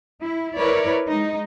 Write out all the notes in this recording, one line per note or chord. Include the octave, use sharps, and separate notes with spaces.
E4
E4 A#4 B4 C#5 D5
G#3 D#4